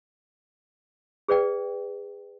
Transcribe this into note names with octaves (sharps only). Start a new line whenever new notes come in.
G#4 B4 D5 G5